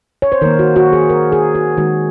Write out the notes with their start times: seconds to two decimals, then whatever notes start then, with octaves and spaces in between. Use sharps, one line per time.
0.22 C#5
0.32 C5
0.42 D#3 A#3 A#4
0.59 F#4
0.76 F#4
0.93 G#4
1.10 A#4
1.32 G#4
1.55 F#4
1.78 D#3 G#3 F#4